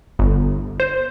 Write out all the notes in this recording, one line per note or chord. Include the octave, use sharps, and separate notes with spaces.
G1
C5